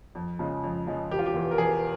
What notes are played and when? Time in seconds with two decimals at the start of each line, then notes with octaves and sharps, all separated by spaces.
0.15 F2
0.39 C#3 F3 G#3
0.64 F2
0.87 C#3 F3 G#3
1.11 E1 G4
1.19 F4
1.26 G4
1.34 E2 E3
1.51 A#4
1.58 E1 G#4